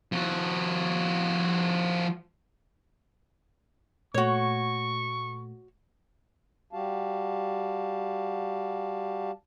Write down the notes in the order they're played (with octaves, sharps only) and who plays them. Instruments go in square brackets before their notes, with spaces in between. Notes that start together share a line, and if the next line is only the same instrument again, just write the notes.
[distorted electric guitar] F3 F#4
[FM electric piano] A#2 A3 [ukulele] F#4 C#5 [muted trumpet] C#6
[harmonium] G3 F#4 G4 F5 A5